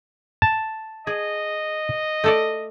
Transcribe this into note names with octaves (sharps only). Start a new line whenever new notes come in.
A5
G#4 D#5
A3 A4 D5